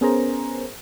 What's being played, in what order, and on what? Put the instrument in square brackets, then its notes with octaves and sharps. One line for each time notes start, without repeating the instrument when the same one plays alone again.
[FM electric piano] B3 C#4 G#4 A#4 C5 A#5